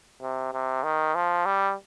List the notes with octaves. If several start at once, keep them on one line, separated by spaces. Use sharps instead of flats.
C3
C3
D#3
F3
G3